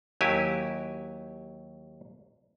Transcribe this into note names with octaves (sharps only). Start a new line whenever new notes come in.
D#2 F#3 E4 G4 G#5